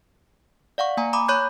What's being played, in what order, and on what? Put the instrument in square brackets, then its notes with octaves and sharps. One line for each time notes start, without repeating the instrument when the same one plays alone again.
[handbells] D5 F5 F#5 C#6
A#3 G#5 A#5
A#5 B5 D6 D#6
C#5 B5 C#6 F#6 G6